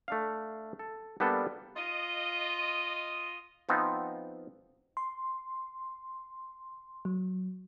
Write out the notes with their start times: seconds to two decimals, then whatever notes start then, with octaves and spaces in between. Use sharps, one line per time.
0.08 A3 D4 F5
0.79 A4
1.20 G3 A#3 B3 D4 A4
1.76 F4 D#5
3.69 F3 B3 C4 D#4
4.97 C6
7.05 F#3